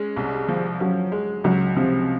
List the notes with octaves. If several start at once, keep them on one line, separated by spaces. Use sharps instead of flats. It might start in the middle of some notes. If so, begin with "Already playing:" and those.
Already playing: G#3 C#4
C2
F3
F#3 C#4
G#3
C#2 F#3
C3 F3